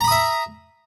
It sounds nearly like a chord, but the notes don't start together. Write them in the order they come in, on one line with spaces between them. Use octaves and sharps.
A#5 B5 D#6 E5